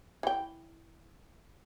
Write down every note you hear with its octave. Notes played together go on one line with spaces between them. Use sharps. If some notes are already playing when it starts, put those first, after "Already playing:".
E3 G5